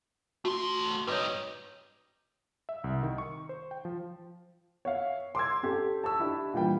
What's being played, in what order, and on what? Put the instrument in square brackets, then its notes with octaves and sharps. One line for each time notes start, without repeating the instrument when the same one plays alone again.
[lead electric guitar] A3 C6 [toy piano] F#4
[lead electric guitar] G2 D#4 [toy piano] B4 C#5
[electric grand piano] E5
C2
D#3
C#6
C5
G5
F3
[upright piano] C#5 E5 F5
C6 D6 E6 G#6
C#4 G4 A4
A5 C#6 E6
D4 E4 G4
A#2 E3 G3 G5